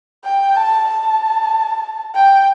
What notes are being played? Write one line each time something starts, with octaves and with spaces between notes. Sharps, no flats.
G5
A5
A5
G5